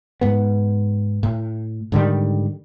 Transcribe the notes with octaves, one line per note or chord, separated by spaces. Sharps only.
G#2 B3
A2
G#2 D3 D#3 G3